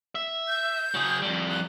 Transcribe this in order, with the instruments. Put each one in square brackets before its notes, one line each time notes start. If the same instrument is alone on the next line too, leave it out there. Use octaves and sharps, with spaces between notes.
[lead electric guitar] E5
[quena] G6
[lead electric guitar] F#3 G#4
F2 G3
[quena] F#6